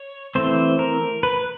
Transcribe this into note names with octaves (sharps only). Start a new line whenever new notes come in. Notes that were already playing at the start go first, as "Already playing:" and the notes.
Already playing: C#5
E3 A3 C4 C5
A#4
B4